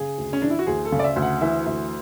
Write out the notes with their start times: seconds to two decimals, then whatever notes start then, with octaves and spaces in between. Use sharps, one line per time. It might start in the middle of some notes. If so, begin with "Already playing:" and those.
Already playing: C#3 G#4
0.18 D2
0.33 C#4
0.42 E3 D4
0.50 E4
0.59 F#4
0.67 D2 G#4
0.85 A4
0.92 C#3
0.99 D5
1.04 E5
1.16 D2
1.22 F#5
1.41 E3 E5
1.66 D2 E5